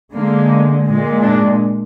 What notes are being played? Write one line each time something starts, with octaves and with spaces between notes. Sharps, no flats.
D3 G#3 A#3
A#2 G#3
D4